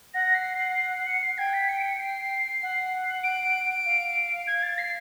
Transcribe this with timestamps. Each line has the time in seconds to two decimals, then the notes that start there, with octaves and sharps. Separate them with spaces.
0.14 F#5 A#6
0.35 C7
0.55 C7
0.76 C7
0.91 C7
1.07 C#7
1.22 C7
1.38 G5 G#6
1.53 B6
1.69 C#7
1.79 D7
1.84 C#7
2.00 C7
2.62 F#5
3.24 D7
3.85 F5
4.47 G#6
4.63 A6
4.78 C7